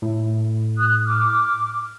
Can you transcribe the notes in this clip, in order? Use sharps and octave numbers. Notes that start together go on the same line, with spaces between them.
A2
D#6 F#6
D6 F6